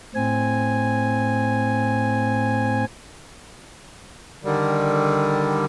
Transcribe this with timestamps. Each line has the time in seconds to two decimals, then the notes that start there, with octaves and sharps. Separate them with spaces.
0.15 A2 C4 G#5
4.44 D3 D#3 G3